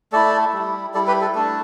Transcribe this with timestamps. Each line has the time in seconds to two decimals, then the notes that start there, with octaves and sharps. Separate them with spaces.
0.12 A3 E4 A4 D5
0.54 G3 E4
0.94 G3 E4 A4 D5
1.07 G4 B4
1.21 A4
1.35 A3 D4 A4